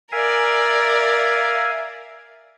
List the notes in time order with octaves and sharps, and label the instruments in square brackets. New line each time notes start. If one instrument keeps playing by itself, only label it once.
[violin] A#4 D5 [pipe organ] E5 F5 G#5